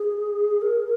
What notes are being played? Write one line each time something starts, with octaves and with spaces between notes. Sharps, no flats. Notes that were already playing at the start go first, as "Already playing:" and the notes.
Already playing: G#4
A#4